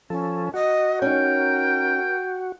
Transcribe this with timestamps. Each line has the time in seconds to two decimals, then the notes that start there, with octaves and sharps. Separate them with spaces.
0.10 F3 C#4 A4
0.54 F#4 D#5
1.02 C#4 D#4 A#4 G5